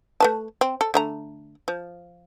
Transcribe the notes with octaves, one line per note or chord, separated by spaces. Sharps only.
A3 B4 A5
C4
A4
D3 A3 A#5
F3